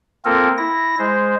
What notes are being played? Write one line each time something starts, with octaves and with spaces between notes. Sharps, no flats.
A#3 C4 F4 A4 A#4
E4 A#6
G#3 C5